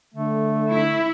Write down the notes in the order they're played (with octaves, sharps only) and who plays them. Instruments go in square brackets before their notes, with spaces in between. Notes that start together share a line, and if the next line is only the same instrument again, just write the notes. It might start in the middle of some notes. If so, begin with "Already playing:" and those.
[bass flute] D3 [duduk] A3
[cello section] E4